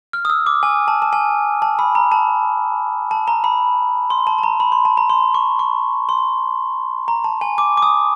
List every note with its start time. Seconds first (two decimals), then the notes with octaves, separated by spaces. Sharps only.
0.13 F6
0.25 D#6
0.30 E6
0.47 D6
0.63 G#5
0.88 A5
1.02 A5
1.13 G#5
1.62 A5
1.79 B5
1.95 A#5
2.12 A5
3.11 A5
3.28 A#5
3.44 B5
4.10 C6
4.27 A5
4.38 A5
4.43 A#5
4.60 B5
4.72 C6
4.85 A5
4.97 A#5
5.10 C6
5.34 C#6
5.59 C#6
6.09 C6
7.08 A#5
7.24 A5
7.41 G#5
7.58 D6
7.77 D6
7.82 D#6